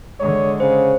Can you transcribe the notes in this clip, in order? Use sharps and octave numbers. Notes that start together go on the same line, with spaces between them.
D3 G#3 C#5
C#3 C5